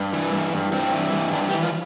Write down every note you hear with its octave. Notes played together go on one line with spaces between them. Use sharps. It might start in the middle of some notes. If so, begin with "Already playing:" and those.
Already playing: G2
E3
G2
G2
G2 C4
E3
G2
E3 D4
G4
E3
F4